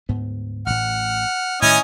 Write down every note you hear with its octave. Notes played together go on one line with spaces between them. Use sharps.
D2 G#2 B3
A1 A2 F#5 F6
A2 D#3 C#4 E4 D#5 G#5 D#6 G6